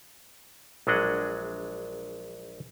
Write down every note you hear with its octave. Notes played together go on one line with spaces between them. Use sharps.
A#1 F#3 G#3 D4 D#5 F#5